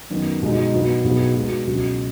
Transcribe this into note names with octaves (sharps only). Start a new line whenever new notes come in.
F#2 D#3 B3
B2 G#3 D#4
B1 B2 B3 F#4
B1 B2 B3 G#4
B2 G#3 B3 F#4
C#2 B2 F#3